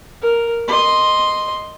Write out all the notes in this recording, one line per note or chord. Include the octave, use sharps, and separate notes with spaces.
A#4
D#5 C6